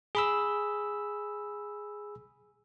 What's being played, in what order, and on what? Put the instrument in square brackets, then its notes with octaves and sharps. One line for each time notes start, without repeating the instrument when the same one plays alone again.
[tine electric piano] G#4 B5 E6